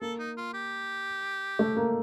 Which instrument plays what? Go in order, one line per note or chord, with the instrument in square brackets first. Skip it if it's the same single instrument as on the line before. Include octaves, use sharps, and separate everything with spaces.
[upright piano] A#3 [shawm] A4
[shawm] D#4
F4
G4
[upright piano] A3
A#3